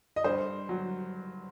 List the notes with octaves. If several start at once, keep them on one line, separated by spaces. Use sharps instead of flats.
D#5
G2 C5
F#3